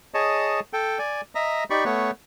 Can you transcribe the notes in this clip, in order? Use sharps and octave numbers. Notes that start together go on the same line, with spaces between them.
G#4 C#5 D#5 A5
A4 G5
D5 G#5
D#5 E5 A#5
D#4 G4 D5 B5 C#6
A3 B3 B4 C#5